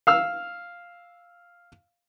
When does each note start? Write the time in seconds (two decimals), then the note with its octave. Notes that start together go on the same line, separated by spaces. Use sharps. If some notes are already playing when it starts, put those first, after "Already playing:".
0.07 F5 E6 F6